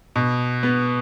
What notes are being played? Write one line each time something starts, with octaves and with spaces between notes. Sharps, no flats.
B2
B3